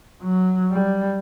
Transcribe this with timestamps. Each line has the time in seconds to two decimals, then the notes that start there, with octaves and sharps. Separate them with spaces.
0.22 F#3
0.71 G3